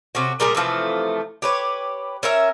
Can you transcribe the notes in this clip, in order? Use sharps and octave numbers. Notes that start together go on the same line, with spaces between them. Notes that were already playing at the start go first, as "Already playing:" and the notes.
C3 C#4 F#4
A#2 G3 G#4 A#4
C3 E3 F3 A3
G4 B4 C#5
C#4 A#4 E5